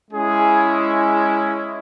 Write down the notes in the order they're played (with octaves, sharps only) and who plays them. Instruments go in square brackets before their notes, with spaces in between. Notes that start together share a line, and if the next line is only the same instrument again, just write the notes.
[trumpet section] G#3 C#4 E4 G#4